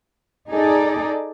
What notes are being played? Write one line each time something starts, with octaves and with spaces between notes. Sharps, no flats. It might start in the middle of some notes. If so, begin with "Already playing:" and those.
D#4 G#4 A4 D5